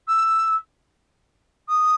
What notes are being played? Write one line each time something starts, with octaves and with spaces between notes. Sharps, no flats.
E6
D#6